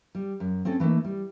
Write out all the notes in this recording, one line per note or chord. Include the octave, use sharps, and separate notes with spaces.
G3
F#2
C4 C#4 G#4 A4
E3 A3 A#3 D#4
G3